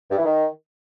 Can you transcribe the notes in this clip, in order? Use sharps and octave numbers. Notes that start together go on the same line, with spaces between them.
G2
E3
D#3